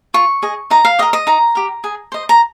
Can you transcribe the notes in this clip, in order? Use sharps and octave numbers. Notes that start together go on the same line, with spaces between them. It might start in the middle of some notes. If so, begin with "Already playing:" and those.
F4 C#6
G#4 D#5
D#4 A#5
F5
G4 A#4 D#5
D#5
D#4 A#5
G4 A#4
G#4
C5 D#5
A#5